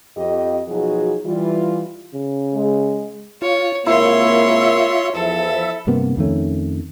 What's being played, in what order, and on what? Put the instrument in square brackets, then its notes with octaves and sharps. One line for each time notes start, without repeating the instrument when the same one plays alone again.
[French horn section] F2 G4 D#5
B2 F3 F#3 D#4 F#4 G#4
E3 G3 F4
[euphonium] C#3
[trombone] G#3
[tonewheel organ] F4 [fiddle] C#5
[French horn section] C3 G#3 A#3 [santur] E4 [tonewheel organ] F4 E5 [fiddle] C#5 C6
[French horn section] E2 F3 [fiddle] A4 [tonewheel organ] E5
[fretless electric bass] G2 C3 A#3 B3
F2 D#3 A3 C#4